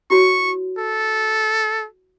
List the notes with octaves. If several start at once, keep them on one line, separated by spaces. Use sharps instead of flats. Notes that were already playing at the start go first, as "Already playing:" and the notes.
E4 F#4 C#5 C#6
A4